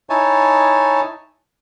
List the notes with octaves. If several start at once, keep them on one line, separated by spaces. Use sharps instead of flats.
D#4 E4 C#5 G#5 A5